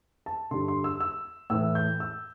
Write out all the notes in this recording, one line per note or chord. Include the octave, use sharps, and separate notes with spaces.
A5
G2 D3 C6
C6
E6
E6
A2 E3 E6
G6
E6